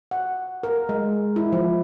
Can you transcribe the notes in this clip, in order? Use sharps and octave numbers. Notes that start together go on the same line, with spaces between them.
F#5
A#4
G#3
E4
F3